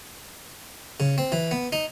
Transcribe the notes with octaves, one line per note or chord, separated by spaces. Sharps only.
C#3
C4
E3
B3
D#4